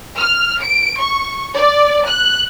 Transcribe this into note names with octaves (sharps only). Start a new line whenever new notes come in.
F6
D7
C#6
D5
F#6